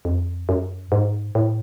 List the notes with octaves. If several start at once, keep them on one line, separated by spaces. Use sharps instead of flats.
F2
F#2
G#2
A2